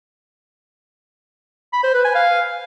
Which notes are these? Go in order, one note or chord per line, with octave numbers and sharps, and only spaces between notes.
B5
C5
B4
G#5
F5